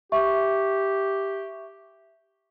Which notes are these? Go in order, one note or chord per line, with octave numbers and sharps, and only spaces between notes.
G4 E5 C#6